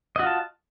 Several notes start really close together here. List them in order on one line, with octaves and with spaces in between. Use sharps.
D#5 F#4 F4 A5